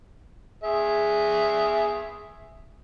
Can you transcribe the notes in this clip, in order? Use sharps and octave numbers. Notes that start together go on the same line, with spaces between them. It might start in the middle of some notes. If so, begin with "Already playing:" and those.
G#4 E5